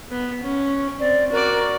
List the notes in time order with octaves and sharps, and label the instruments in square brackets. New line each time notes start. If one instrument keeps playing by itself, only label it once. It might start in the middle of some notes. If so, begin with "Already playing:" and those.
[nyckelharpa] B3
C#4
[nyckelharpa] C4 [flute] D5
[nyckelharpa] F#4 D5 [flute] A#4